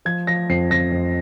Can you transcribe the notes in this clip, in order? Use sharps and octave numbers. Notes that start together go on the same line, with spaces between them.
F3 G#6
F3 A#6
F2 C7
F2 A#6
F2